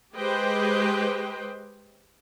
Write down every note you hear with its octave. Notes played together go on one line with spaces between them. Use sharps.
G#3 G4 B4 C5 D#5 G5